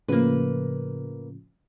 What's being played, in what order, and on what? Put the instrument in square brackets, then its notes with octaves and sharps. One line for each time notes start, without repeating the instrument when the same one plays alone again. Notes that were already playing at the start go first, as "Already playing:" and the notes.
[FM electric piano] A2 C#3 F3 [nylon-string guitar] A#3 B4